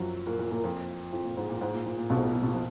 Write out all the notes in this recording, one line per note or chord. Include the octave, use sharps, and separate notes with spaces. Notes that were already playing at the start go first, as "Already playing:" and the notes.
Already playing: F#2 F3 F#3
A#2 A#3
A#2 A#3
A#2 A#3
F2 F3
F2 F3
A#2
G#2
A#2
G#2
A#2
A#2
A#2
B1 B2
G#2
A#2
A#2
B2
A#2
F3